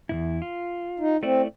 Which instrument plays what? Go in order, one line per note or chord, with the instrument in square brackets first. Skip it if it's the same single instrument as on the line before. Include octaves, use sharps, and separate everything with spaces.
[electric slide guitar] E2 G#2 E4
F4
[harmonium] D#4
[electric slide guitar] A3 E4 D5 [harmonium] C4